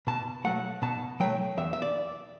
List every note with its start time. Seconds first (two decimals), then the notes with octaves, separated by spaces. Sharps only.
0.07 B2 A5
0.44 F#3 A3 F#5
0.82 B2 A5
1.20 F#3 A3 G5
1.57 E2 E5
1.73 E5
1.82 D5